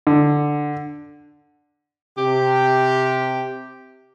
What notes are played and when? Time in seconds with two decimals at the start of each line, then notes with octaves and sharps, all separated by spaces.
0.07 D3
2.17 C3 G4